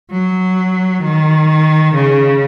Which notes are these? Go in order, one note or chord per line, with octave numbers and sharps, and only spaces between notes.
F#3
D#3
C#3